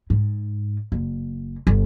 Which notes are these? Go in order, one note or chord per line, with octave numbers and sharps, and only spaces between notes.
G#2
F#1
G1